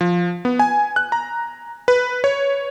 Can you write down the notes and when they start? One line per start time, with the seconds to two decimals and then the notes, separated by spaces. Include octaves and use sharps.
0.01 F3
0.45 B3
0.59 G#5
0.96 F#6
1.12 A#5
1.88 B4
2.24 C#5